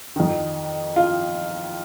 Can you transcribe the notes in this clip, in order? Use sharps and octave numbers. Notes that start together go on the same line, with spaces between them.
F2 D#3
F4